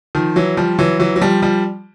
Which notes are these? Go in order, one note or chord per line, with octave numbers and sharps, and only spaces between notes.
D#3 F3
E3 F#3
F3 G3
E3 F#3
E3 F#3
F#3
F3 G3
F3 G3